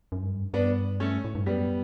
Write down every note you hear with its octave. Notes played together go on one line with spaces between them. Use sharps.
F#2
G2
G2 B3 D4
A3 C#4
A2
G2
F#2 G3 B3